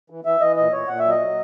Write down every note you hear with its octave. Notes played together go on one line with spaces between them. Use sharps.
E3
E3 E5
E3 D#5
A#2 D#5
A#2 C#5
A#2 F#5
E5
F#3 D#5
F#3